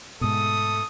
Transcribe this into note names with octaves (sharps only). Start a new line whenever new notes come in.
G#2 B2 A3 A4 D#6